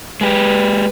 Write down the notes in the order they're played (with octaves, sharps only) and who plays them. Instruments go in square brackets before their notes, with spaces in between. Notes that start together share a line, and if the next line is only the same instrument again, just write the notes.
[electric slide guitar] G#3 G4 [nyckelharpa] B4